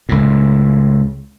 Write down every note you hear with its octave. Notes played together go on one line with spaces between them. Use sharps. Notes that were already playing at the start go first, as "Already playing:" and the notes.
C#2 A2